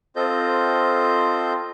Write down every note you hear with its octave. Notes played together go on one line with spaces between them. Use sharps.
C4 F4 A4 C5 D#5 G6